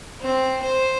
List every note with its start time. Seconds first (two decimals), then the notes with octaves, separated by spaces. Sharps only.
0.21 C4
0.62 C5